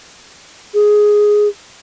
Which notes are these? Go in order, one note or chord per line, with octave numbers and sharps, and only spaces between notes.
G#4